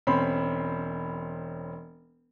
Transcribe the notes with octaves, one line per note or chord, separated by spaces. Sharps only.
E1 C4 C#4 B5 C6